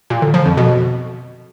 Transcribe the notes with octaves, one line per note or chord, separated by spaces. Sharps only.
A#2
D3
F3
F2
B2